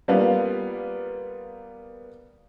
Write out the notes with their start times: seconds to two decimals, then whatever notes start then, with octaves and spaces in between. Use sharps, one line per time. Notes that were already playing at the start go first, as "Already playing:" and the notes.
0.08 G3 A#3 B3 F4 F5